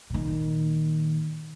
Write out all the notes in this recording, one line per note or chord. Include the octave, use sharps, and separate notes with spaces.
A#2 D#3